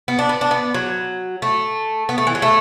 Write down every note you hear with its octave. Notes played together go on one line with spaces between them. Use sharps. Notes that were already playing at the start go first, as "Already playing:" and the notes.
B3
D4
B3
D4
B3
F#3
A3
B3
A3
E3
F#3
A3